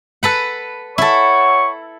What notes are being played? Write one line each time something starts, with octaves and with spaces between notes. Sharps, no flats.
A4 B4 F#5
E4 A4 C#5 F#5 C#6